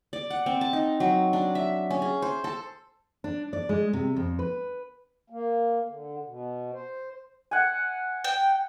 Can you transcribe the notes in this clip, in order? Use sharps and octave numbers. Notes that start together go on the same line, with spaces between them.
D5
F#5
C4
A5
D#4
F#3
D4
E5
C#4
G#4
C5
A4
D4
D5
G#3
C3
F2
B4
A#3
D3
B2
C5
F#5 G#5
G5